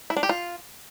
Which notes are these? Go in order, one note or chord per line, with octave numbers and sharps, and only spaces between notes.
E4
D4
G4
F4